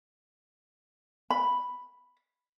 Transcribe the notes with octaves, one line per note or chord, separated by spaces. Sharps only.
B5